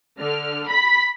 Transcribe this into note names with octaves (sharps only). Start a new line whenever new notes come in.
D3 F6
B5 B6